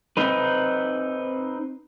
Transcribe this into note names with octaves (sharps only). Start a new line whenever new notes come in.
C4 D#4 B4